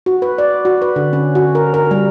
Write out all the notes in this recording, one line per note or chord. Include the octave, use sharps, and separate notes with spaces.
F#4
B4
D5
F#4
B4
D3
C#4
F#4
A#4
A#4
G3